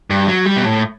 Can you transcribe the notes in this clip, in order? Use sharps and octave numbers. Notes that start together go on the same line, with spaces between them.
G2
F#3
G3
B2
A2